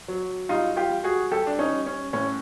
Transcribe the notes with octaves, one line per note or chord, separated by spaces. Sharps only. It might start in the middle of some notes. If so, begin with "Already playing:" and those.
F#3
G3 D#4 F4
F4 G4
G3
F#4 G#4
G3 G4 A4
D4
C#4 D#4
G3
C#4
A2 C#4